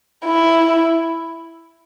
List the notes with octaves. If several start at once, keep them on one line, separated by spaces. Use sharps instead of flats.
E4